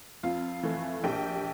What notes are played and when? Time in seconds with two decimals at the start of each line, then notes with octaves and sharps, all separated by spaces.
0.23 F2 F4 F5
0.63 E3 A3
1.04 A#1 G4 G5